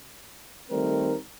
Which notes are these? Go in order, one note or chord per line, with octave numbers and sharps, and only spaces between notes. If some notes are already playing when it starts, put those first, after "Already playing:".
D#3 G3 A3 C4 A#4